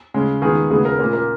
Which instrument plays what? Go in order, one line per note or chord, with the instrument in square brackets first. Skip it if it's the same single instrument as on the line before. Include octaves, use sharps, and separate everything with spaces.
[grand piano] C#3 G#3 C#4
D#3 G#3 B3 G#4
C#3 G#3 B3 G#4
A#4
A#2 A#3 C#4 A#4
A#4